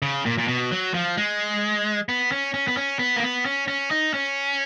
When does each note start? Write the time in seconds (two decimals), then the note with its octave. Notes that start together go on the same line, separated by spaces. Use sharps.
0.02 C#3
0.26 A#2
0.38 A#2
0.48 B2
0.71 F#3
0.94 F3
1.17 G#3
2.09 B3
2.32 C#4
2.54 C#4
2.68 B3
2.77 C#4
2.99 B3
3.16 A#3
3.23 B3
3.45 C#4
3.68 C#4
3.91 D#4
4.14 C#4